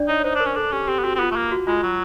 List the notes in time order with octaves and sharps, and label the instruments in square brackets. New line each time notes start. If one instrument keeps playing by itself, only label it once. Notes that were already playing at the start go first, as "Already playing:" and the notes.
Already playing: [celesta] D4 D5
[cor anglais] D#4 [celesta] C#5
[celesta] C#5
[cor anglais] D#4 [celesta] C5
[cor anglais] D4
[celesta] A#4
[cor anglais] C#4
[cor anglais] D4 [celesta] A4
[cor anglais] C#4 [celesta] G4
[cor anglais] C4 [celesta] G4
[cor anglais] B3
[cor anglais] C4 [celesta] F#4
[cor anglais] C4
[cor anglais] B3 [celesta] F4
[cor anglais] A3
A#3
[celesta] F#4
[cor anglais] G#3 [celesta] F4
[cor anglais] F#3